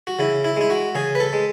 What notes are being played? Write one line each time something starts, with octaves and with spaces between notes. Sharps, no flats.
F#4
C#3 E4
E4
G#3 E4
F#4
C#3 G#4
B4
A4
G#3